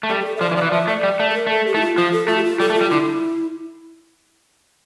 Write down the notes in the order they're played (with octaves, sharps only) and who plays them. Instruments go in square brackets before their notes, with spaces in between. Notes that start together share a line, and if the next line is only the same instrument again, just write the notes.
[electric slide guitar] A3
[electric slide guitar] G3 [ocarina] A4
[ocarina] G4
A4
E5
[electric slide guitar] F3 [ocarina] D5
[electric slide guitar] E3
[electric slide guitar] F3 [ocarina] D5
[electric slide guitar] E3
[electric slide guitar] F3 [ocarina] E5
[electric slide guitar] A3 [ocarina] D5
[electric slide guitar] G3
A3
[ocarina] A4
A#4
[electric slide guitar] A3 [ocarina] A4
[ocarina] G4
[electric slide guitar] A3 [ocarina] E4
[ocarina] F4
[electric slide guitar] F3 [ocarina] F4
[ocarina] A4
[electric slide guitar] A3 [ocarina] F4
[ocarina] G4
F4
[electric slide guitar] G3 [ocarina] A4
[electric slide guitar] A3
[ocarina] F4
[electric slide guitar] G3
[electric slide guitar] D3 [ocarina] E4